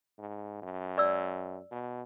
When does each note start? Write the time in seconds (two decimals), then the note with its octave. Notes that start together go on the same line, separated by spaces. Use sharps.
0.18 G#2
0.62 F#2
0.98 D5 E6
1.71 B2